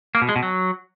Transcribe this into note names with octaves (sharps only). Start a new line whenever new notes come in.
A#3
B2
G#3
B2
F#3